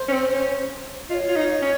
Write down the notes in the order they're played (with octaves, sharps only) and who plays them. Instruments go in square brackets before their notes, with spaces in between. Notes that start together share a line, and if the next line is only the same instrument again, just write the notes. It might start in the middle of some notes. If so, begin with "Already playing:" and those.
Already playing: [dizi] C5
[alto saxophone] C#4
C4
C#4
[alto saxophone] F4 [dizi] D#5
[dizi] C#5
[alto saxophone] F4
D#4
C#4